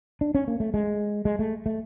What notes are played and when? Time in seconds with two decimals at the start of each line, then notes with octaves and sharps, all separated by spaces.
0.21 D4
0.35 C#4
0.48 A#3
0.60 A3
0.74 G#3
1.25 G#3
1.39 A3
1.66 A3